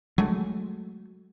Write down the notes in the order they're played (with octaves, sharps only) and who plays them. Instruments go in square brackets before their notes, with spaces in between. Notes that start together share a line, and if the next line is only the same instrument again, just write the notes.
[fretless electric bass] F#3 G#3 A3